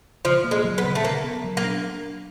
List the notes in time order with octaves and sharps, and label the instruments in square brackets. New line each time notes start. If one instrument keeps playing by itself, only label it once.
[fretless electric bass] C#3 [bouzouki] F3
[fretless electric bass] A#3
[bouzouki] G#3
[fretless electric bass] F#3
[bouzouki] B3
[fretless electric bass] C#3
[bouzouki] A3
[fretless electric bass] C#3 [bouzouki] A#3
[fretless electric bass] B3
F#3
[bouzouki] A#3
[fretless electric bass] D4